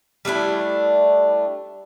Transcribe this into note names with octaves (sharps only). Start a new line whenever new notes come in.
G3 A3 D4 E4